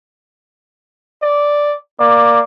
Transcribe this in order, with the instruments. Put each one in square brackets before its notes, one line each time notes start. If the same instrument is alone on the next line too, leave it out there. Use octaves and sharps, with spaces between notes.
[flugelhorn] D5
[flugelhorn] A#3 [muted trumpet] D5